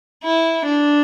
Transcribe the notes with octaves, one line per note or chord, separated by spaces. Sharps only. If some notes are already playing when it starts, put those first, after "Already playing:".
E4
D4